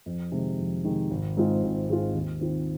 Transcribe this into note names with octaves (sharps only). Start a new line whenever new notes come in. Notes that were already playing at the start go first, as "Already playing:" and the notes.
F2
C3 D#3 G#3
F2
C3 D#3 G#3
G#1
G#2 G#3 C4 F4
G#1
G#2 G#3 C4 F4
D#2
D#3 C4 F4